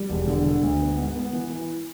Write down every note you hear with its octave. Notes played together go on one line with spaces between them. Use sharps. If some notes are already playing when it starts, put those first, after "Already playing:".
Already playing: G3
E1
D3
D3
D2
B3
G#2
B3
E3
E3